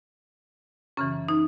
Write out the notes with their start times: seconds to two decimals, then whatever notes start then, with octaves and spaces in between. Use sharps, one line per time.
0.97 F#2 C#3 E3 C#4
1.29 D#4